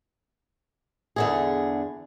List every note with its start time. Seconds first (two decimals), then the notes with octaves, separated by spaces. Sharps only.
1.16 E2 D3 G#4